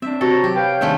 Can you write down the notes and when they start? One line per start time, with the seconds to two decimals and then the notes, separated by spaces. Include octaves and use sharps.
0.02 C4 D4 E5
0.21 C3 F#4 A4 C#5 A#5
0.44 F#3 G4
0.56 B4 C#5 F5 G5
0.81 D#3 G#3 A3 C4 D4 E5